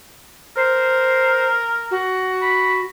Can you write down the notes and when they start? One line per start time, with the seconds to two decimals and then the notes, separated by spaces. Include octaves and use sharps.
0.56 A#4 C5
1.91 F#4
2.42 B5